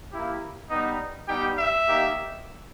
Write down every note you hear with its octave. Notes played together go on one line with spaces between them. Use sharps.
A#3 E4 G4
G3 B3 D#4
G3 B3 D#4 G4 G5
E5
A#3 D#4 G4